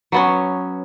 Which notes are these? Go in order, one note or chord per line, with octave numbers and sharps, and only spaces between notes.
F#3 B3 C#4